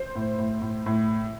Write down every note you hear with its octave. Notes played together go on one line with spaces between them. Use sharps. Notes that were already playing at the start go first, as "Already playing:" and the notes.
Already playing: C5
A2
A2
A2
A2